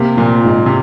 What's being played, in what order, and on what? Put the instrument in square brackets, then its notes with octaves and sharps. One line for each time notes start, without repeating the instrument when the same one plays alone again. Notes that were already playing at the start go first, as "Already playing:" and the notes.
Already playing: [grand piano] C3 [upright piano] A#3
[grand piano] A#2 [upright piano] F3
[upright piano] G#2
[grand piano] C3